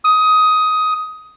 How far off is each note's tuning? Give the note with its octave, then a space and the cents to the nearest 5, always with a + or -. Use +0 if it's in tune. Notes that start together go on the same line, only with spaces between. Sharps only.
D#6 +15